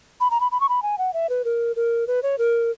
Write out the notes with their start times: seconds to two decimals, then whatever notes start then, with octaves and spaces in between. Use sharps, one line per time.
0.20 B5
0.31 A#5
0.40 B5
0.52 B5
0.60 C#6
0.69 B5
0.82 G#5
0.98 F#5
1.14 E5
1.29 B4
1.45 A#4
1.76 A#4
2.07 B4
2.23 C#5
2.38 A#4